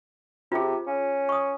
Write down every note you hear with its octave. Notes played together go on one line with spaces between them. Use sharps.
C3 F4 G#4
C#4
C#6 D#6